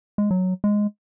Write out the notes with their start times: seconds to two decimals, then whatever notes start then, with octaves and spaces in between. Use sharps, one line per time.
0.18 G#3
0.31 F#3
0.64 G#3